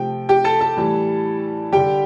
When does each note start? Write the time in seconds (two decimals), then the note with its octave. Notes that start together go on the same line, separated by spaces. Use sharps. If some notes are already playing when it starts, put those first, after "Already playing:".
Already playing: C3 F3 A3 G5
0.29 G4 G5
0.44 A4 A5
0.61 A4 A5
0.77 A2 E3 G3
1.72 D3 G3 G4 G5